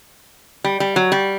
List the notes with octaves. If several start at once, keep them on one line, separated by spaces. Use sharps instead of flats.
G3
G3
F#3
G3